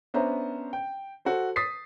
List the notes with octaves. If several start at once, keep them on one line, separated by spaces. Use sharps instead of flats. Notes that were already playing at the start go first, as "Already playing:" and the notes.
B3 C#4 D4 C5 E5 A#5
G5
F#4 A4 C5
D#6 A6 B6 C7